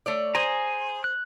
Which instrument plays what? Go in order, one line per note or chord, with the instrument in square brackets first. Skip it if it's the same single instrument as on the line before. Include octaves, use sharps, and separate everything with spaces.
[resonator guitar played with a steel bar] A3 C#5 D5
[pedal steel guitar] G#4 G#5 A#5 [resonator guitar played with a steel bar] C5
[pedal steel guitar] F#6